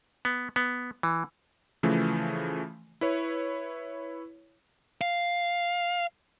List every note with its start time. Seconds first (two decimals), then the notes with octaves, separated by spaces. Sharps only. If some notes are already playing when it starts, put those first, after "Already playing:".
0.25 B3
0.56 B3
1.03 E3
1.83 C#3 E3 F3 A3
3.01 E4 B4 C#5
5.01 F5